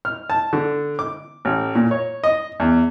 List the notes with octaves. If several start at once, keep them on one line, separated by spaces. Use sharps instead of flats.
F6
A5
D3
D6
A1
A#2
C#5
D#5
E2